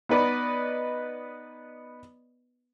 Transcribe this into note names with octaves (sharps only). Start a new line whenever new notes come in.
B3 D#4 B4 D5 D#5